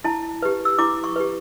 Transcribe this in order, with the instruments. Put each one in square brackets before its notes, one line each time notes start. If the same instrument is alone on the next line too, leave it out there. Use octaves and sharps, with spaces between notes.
[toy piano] E4 A5
G4 B4
E6
E4 D6
C#6
G4 B4